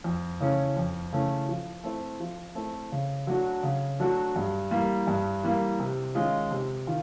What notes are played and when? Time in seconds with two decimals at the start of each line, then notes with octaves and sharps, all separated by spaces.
0.04 F2
0.40 C#3 E3 A3 C#4
0.76 F2
1.12 C#3 E3 A3 C#4
1.48 F3
1.83 A3 C4 E4
2.20 F3
2.55 A3 C4 E4
2.92 C#3
3.27 F#3 A3 D4 F#4
3.63 C#3
3.99 F#3 A3 D4 F#4
4.36 G2
4.71 E3 G3 A#3
5.07 G2
5.43 E3 G3 A#3
5.80 C3
6.15 D#3 G#3 C#4 F4
6.51 C3
6.87 D#3 F4